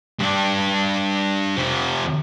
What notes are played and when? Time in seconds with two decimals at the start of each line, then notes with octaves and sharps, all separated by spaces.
0.20 G2 D4
1.57 C3 F3